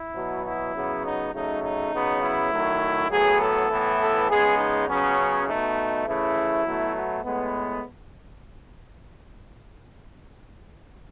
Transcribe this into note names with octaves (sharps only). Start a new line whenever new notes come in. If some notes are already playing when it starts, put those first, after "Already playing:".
Already playing: E4
B2 F#3 B3
E4
C#3 F#3 B3
D#4
C#3 F#3 A3 D#4
D#4
C#3 F#3 B3
E4
D#3 F#3 A3
A2 F#3 B3 G#4
A4
A2 E3 B3
A4
C#3 G#3 B3 G#4
D#4
C#3 F#3 B3 C#4
B2 A3 D#4
C#3 E3 A3 E4
B2 F#3 A3
B3
A2 G#3 B3